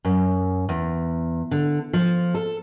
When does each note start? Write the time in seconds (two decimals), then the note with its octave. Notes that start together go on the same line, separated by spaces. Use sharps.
0.05 F#2
0.69 E2
1.51 D3
1.93 F3
2.35 A4